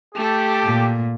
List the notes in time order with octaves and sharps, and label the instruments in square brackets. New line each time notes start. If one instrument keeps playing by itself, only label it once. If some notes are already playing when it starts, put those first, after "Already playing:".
[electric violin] A3 A4 [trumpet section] G4
[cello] A#2